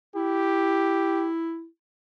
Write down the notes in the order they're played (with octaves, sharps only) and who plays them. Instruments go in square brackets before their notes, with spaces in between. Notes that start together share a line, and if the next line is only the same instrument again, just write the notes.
[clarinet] E4 [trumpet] G4